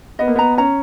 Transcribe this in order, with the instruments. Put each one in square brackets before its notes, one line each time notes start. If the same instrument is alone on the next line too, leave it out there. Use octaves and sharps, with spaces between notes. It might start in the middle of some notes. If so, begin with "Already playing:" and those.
[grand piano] B3 [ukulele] D#5
[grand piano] A#3
[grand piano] B3 [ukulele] A#5
[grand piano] C#4 [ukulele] A#5